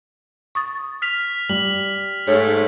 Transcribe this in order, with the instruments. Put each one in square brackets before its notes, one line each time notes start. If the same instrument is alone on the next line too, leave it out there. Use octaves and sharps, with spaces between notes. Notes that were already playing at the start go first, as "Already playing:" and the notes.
[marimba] C#6 D#6 A6
[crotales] F6 B6 F7
[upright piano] G3 [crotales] F#7
[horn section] G#2 A3 [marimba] C#5 F6